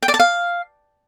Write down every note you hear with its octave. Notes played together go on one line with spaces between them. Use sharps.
G5
D5
A5
F5